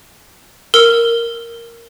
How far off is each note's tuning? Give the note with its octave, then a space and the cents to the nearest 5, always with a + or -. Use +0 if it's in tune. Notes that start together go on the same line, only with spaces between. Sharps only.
A#4 -5 E6 +0